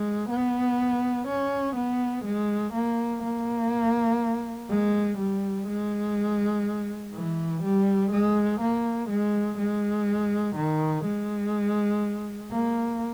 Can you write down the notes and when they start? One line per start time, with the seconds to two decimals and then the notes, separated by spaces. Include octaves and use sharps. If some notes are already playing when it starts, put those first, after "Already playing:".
Already playing: G#3
0.30 B3
1.28 C#4
1.76 B3
2.25 G#3
2.74 A#3
3.23 A#3
4.70 G#3
5.18 G3
5.67 G#3
7.13 E3
7.63 G3
8.12 G#3
8.61 A#3
9.10 G#3
9.58 G#3
10.56 D#3
11.05 G#3
12.52 A#3